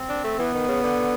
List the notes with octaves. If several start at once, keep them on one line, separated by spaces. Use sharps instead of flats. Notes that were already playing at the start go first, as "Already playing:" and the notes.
Already playing: C4
D4
A3
E3 B3
D#3
C#3
D3